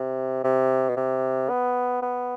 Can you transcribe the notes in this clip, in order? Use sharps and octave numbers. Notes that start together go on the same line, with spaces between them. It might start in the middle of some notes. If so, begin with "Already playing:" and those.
Already playing: C3
C3
B2
C3
B3
B3